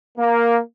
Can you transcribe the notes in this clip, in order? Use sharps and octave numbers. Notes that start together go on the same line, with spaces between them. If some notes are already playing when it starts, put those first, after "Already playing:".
A#3